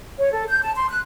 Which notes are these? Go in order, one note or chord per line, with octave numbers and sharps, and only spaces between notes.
C#5
A4
G6
A5
C6
F#6